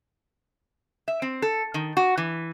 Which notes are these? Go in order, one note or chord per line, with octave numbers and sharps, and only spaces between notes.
E5
C4
A4
D#3
F#4
E3